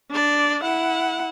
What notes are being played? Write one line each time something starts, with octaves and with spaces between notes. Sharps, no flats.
D4 D5
E4 F#5